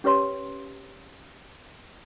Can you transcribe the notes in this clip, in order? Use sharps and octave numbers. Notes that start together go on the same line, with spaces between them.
C#4 G4 B4 C#5 C6